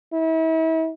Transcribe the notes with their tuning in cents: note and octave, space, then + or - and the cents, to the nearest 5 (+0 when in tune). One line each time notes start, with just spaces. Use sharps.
E4 -40